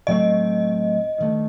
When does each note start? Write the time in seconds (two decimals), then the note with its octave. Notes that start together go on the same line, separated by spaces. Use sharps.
0.07 A2 F#3 A3 C4 D#5
1.18 G2 D#3 A3